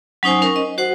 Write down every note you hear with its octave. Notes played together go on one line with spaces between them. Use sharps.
F#3 C#4 D#4 C5 G#5
C#4 A#4
D#5
F#4 C5 F#5